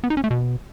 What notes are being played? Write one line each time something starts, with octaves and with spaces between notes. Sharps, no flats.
B3
D#4
C#4
A3
B2